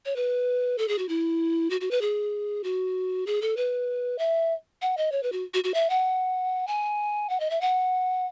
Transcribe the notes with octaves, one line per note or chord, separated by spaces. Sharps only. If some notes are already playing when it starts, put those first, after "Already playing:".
C#5
B4
A4
G#4
F#4
E4
F#4
F#4
B4
G#4
F#4
G#4
A4
B4
E5
F#5
D#5
C#5
B4
F#4
F#4
F#4
E5
F#5
G#5
F#5
D#5
E5
F#5